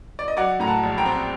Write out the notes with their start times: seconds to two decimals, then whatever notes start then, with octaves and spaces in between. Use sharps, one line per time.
0.19 D5
0.28 D#5
0.37 F#3 D5 F#5
0.60 A2 A#5
0.67 F#5 A5
0.83 A#1
0.98 G5 A#5
1.06 C4